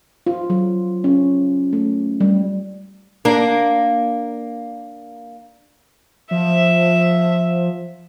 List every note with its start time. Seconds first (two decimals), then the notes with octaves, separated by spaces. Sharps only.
0.26 F4
0.50 F#3
1.04 C#4
1.73 A3
2.21 G3
3.25 A#3 D4
6.31 F3 E5